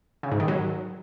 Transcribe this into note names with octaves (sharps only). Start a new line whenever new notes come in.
C#3
G#2
D#3
F#3